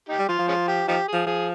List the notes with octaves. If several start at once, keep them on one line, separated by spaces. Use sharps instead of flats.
D#4 G4
G3
F3 F4
F3
G#3 C#4 F4
G4
F3 D#4 G4
G#4
F3
F3 G#4